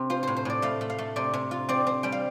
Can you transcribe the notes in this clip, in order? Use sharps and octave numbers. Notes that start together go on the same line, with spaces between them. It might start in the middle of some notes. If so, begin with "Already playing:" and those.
Already playing: C3 C4
F4 C5
A2 C5
C5
A2 D5
A3 F5
A3
F5
A3
C3 D5
C3
F4
C4 D5
C4
G3 G5
F5